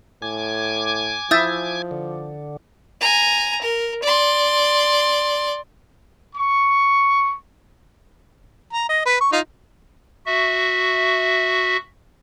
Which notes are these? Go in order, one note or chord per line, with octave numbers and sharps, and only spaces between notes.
A2 G#5 D6 G#6
F3 E4 E5 D#6 G6 A6
D3
G#5 A#5
A#4
D5 C6
C#6
A#5
D#5
B4
C#6
D#4 F4
F#4 E5